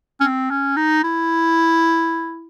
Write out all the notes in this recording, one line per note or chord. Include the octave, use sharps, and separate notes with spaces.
C#4
C4
C#4
D#4
E4